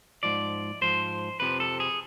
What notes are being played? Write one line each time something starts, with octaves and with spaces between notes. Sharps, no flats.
G#2 F3 D5
G#2 F3 C5
F2 C3 F3 B4
A4
G#4